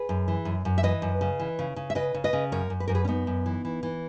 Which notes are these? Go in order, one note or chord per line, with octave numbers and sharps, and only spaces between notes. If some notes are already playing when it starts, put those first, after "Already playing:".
Already playing: G#4 B4
F#2
E3
F#2
F#2
E5
E3 B4 D#5
F#2
C#3
E3
C#3
C#3
E5
C#3 B4 D#5
C#3
B4 D#5
C#3
F#2 A#4 C#5
F#2
B4
F#2 A#4
G#4 B4
C#4
F#2 B3 D#4
F#2
E3
E3
E3